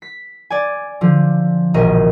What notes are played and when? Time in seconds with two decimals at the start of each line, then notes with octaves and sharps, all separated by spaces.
0.02 B6
0.50 D5 G#5
1.01 D3 F3
1.74 E1 A#1 A#4 D#5